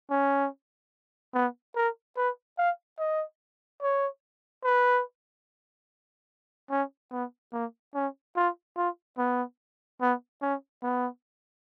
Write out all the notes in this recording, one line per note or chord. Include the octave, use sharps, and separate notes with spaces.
C#4
B3
A#4
B4
F5
D#5
C#5
B4
C#4
B3
A#3
C#4
F4
F4
B3
B3
C#4
B3